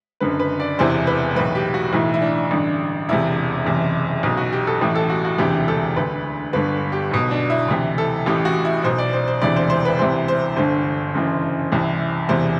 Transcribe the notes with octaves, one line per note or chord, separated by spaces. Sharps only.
F#1 F#2 D3 B4
B4
D5
E1 E2 C3 E3 C5
B4
B1 A2 E3 B4
G4
F#4
B1 A2 E3 E4
E4
D4
A1 G2 D3
E1 E2 C3 E4
F#1 E2 C3 E3
B1 B2
F#4
G4
A4
A1 A2 E3 G4
A4
F#4
F#4
E1 D2 C3 E3 G4
A4
D2 D3 B4
G1 G2 D3 B4
G4
B1 B2
D4
E4
D2 C3 E3
A4
A1 A2 E3 G4
F#4
E4
B1 B2 C5
D5
C5
C5
E1 D2 C3 E3 D5
C5
C5
B4
C2 C3 E3 C5
C5
G1 G2 D3 C5
F#1 F#2 E3
C2 C3 E3
E1 E2 C3 E3 C5